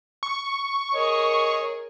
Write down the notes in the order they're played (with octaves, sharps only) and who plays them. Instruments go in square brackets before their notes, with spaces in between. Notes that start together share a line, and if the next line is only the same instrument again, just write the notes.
[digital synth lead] C#6
[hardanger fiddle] G#4 A#4 [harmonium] C#5 D#5